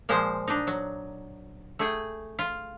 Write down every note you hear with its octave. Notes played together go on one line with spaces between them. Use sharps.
A#2 F3 G#3 C5
D4 D#4
F#3
A3 G#4 G5
F4